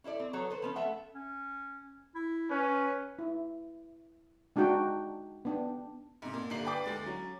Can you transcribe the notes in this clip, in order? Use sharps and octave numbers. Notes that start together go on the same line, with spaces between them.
C#4 E4 A4 D5
C4
F#3 B3 A4 C#5
A4 B4 C5
F3 B3 C#4
A3 A4 E5 F#5
C#4
E4
C#4 B4
E4
G#3 D4 D#4 F#4 G5
B3 D4 G5
G#2 C3
A#2
G1 D3 G3 A#3 C7 F#7
B4 D5 G5 D6
D2 G#3 A6
F#3 C#4